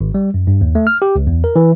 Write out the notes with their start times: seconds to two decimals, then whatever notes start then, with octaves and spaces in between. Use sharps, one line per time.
0.01 G#1
0.14 G3
0.34 F#2
0.47 G2
0.61 D#2
0.75 A3
0.87 F6
1.02 G4
1.16 C#2
1.27 E2
1.44 A#4
1.56 E3